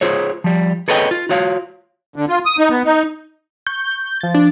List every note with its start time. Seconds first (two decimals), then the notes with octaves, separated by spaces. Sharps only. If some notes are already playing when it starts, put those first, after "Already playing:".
0.01 F4 G#4 C5 C#5
0.44 F3 G3
0.88 G#4 A4 B4 C#5 D#5 G5
1.11 F4
1.29 F4 F#4 C#5 F5
2.16 D3
2.28 F4
2.46 D#6
2.58 D#4
2.70 B3
2.86 D#4
3.67 C#6 G6
4.21 F3 A6
4.34 D4